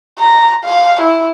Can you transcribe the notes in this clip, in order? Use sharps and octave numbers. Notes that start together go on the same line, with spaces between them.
A#5
F5
E4